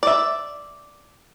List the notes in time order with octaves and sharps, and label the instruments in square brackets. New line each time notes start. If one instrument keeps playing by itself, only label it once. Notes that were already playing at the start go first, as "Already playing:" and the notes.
[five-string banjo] D5 E5